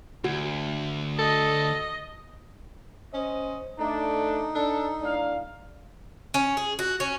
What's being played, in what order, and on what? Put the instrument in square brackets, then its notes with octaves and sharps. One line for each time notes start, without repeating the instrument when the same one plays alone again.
[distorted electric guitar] D2 [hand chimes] F#4
[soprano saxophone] A4 [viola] D#5
[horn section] C#4 C5 D#5
[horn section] A3 D4 [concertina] D#4
[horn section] D4 A4
A2 D4 F5
[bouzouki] C#4
G#4
F#4
C#4